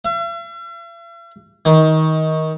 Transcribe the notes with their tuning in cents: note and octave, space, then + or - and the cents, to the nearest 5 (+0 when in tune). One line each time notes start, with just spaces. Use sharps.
E5 +45
D#3 +20